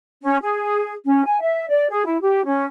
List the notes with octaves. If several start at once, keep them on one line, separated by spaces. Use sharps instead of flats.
C#4
G#4
C#4
G#5
E5
D5
G#4
E4
G4
C#4